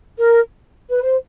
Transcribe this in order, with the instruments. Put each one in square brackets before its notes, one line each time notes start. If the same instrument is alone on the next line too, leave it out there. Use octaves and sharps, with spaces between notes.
[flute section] A#4
B4
C5